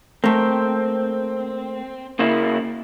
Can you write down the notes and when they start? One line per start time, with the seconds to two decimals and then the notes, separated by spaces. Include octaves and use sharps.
0.24 A3 A#3 C4
2.19 C#3 A#3 E4